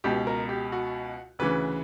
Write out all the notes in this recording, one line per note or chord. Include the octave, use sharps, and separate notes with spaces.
C#2 B2 G4
A#4
G4
F#4
D2 C#3 E3 B4